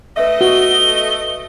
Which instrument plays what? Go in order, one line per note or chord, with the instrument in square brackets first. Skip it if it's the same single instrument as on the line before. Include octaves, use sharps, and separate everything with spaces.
[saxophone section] A3 D#5 [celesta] B4 E5
[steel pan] F#4 [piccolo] G7